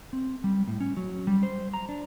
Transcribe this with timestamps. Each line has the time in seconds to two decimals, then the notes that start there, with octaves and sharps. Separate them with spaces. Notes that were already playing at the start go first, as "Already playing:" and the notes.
0.13 C4
0.44 G3
0.68 A2
0.81 C#4
0.97 F#3
1.27 G3
1.43 C5
1.74 A#5
1.89 D4